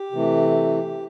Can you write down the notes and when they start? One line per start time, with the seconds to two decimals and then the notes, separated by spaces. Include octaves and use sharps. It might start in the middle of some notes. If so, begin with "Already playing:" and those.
Already playing: G4
0.12 C3 E3 A3